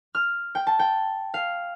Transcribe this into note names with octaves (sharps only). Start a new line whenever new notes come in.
F6
G5
A5
G5
F5